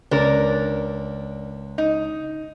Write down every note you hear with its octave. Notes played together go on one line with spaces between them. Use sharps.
C#2 D4 A#4
D#4